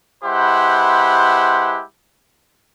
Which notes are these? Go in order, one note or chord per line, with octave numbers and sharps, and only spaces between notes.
G#3 E4 G4 B4 C5 F#5